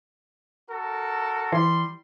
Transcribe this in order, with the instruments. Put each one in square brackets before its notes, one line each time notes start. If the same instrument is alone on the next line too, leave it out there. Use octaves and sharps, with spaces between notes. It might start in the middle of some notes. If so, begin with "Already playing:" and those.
[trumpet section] F#4 A4 A#4
[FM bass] E3 [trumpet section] G3 C6